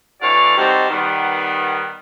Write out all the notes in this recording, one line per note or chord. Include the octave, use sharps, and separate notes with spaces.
D3 E3 F#4 C#5 D5 F5
G3 C4 D#4 F#4 A4 C5
D#3 G3 B3